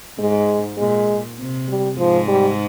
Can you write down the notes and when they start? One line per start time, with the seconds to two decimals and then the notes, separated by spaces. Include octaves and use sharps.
0.19 G#2 G#3
0.78 A#2 G#3
1.39 C3
1.69 G3
1.98 G#2 F3 G#3
2.28 G3